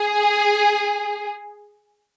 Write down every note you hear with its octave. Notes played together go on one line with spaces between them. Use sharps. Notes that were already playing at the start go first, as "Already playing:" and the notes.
Already playing: G#4